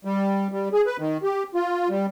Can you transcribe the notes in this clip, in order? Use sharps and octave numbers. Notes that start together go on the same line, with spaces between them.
G3
G3
G#4
B4
D#3
G4
F4
G3